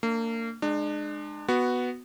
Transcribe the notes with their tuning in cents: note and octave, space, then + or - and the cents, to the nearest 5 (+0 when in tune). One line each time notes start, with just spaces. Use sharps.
A#3 -35 D4 +0
G#3 +5 D4 +35
B3 +0 F#4 +0